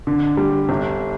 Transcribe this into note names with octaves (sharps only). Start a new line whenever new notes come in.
D3
G3
G1